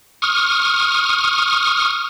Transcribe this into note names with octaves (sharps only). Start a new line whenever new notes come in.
C#6 D#6 F6